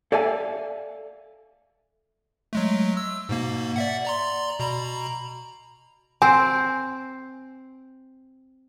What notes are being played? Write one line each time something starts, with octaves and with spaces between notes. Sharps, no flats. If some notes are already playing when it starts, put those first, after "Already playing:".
A4 D5 E5 F5 G#5
F#3 G#3 A3
E6
G#2 B2 A#3
D5 E5 F#5
D5 A#5 C6
B2 A#5 B5
C4 G#5